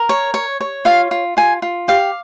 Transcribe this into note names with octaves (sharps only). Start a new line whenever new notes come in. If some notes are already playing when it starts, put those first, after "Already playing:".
Already playing: A#4
C#5
C#5
C#5
F4 F5
F4
F4 G#5
F4
G4 F5